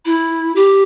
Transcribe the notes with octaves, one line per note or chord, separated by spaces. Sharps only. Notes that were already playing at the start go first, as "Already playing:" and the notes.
E4
G4